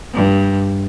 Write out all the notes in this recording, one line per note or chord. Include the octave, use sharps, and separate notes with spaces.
G2